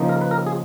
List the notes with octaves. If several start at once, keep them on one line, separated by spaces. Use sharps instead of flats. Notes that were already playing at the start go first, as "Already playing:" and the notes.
Already playing: C#3 F3 A#3 D#4
A#4
B4
A#4
G#4